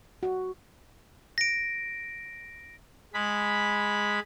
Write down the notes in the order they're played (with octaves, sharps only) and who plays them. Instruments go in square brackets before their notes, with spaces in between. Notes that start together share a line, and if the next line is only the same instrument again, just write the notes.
[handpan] F#4
[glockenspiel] A#6 D7
[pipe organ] G#3 B5